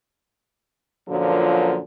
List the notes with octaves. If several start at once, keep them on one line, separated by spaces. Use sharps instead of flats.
F#2 A#2 D3 F3 F#3